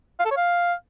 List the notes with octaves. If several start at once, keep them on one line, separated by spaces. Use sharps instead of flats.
F5
A4
C#5
F5